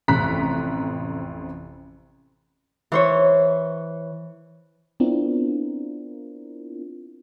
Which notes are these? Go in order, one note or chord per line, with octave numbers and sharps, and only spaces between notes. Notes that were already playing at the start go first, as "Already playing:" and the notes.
A1 F2 C3 A#5 F#6 B6
E3 C5 C#5
B3 C4 D4 E4 F4 A#4